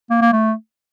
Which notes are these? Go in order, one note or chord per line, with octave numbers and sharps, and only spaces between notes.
A#3
A#3
A3